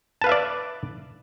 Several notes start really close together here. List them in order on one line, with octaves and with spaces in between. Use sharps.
A5 B4 F5 E5 D5